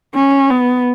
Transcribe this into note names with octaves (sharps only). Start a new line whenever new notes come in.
C#4
B3